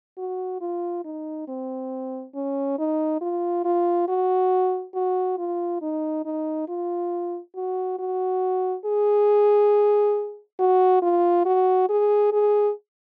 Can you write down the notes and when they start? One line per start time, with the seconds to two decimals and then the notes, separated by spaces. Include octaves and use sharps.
0.18 F#4
0.61 F4
1.05 D#4
1.48 C4
2.35 C#4
2.79 D#4
3.21 F4
3.65 F4
4.08 F#4
4.94 F#4
5.38 F4
5.82 D#4
6.25 D#4
6.68 F4
7.56 F#4
7.99 F#4
8.85 G#4
10.59 F#4
11.02 F4
11.46 F#4
11.89 G#4
12.32 G#4